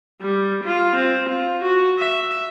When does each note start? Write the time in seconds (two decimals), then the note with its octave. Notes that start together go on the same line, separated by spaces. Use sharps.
0.21 G3
0.64 F4
0.96 C4
1.29 F4
1.62 F#4
1.99 E5